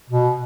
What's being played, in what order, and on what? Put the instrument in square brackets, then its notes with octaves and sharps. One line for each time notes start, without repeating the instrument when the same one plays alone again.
[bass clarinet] B2